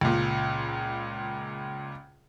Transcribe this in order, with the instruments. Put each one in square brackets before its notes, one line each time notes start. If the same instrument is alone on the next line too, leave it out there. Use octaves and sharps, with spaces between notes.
[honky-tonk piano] C#2 A#2